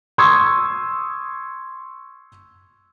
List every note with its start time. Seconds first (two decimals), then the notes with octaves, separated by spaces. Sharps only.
0.18 C6 C#6 D#6 E6 G#6